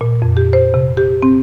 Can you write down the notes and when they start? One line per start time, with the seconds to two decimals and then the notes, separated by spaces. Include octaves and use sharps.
0.01 A#2
0.22 F2
0.37 G4
0.53 C5
0.74 C3
0.97 G4
1.22 C4